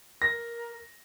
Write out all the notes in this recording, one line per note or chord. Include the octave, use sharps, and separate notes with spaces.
A#4 A#6